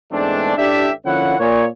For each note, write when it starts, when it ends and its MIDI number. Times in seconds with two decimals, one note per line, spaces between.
0.11 0.53 40
0.11 0.53 44
0.11 0.53 56
0.11 0.53 57
0.11 0.53 60
0.11 0.53 62
0.56 0.90 33
0.56 0.90 62
0.56 0.90 67
0.56 0.90 76
1.06 1.36 50
1.06 1.36 53
1.06 1.36 58
1.06 1.36 61
1.06 1.36 64
1.06 1.36 78
1.39 1.65 46
1.39 1.65 73